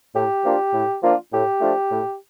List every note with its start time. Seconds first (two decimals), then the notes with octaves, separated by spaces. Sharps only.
0.14 A2 G4
0.43 F3 A#3 D4 F4
0.73 A2
1.03 F3 A#3 D4 F4
1.32 A2 G4
1.61 F3 A3 D4 F4
1.90 A2